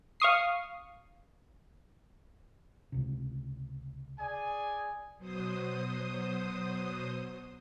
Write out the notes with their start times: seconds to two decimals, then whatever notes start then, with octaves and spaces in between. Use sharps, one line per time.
0.20 F5 C#6 D#6 C7
2.92 C#2 C3
4.19 G#4 D5 G#5
5.17 B2 F#3 C5 D#6